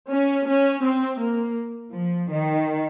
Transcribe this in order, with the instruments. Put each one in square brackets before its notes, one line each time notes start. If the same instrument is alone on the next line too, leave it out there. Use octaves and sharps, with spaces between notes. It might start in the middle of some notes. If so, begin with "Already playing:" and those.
[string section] C#4
C#4
C4
A#3
F3
D#3